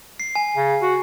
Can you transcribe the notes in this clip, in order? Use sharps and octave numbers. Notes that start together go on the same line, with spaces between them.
C7
G#5
C#3
F#4